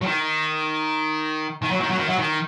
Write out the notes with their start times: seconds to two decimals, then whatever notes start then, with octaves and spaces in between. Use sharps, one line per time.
0.02 F#3
0.06 D#3
1.62 D#3
1.71 F#3
1.80 D#3
1.91 F#3
1.99 D#3
2.10 F#3
2.19 D#3